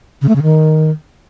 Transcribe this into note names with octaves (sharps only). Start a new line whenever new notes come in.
C#3
A3
C#3
D#3